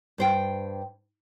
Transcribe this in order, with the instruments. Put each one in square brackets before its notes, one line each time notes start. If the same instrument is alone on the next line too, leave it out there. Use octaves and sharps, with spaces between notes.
[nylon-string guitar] G2 C5 G5